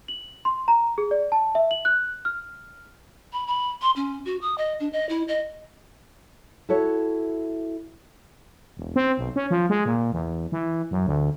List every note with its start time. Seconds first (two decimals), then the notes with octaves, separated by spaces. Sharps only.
0.08 F#7
0.45 C6
0.68 A#5
0.98 G#4
1.11 D5
1.32 A5
1.55 E5
1.71 F#7
1.85 F#6
2.25 F6
3.33 B5
3.47 B5
3.82 C6
3.96 C#4
4.25 F#4
4.42 D#6
4.58 D#5
4.80 D4
4.93 D#5
5.09 E4
5.28 D#5
6.69 E4 F#4 A4 C#5 E5
8.77 E1
8.96 C4
9.18 B1
9.36 C#4
9.51 F3
9.70 G#3
9.85 A#2
10.12 E2
10.52 E3
10.91 F#2
11.06 D2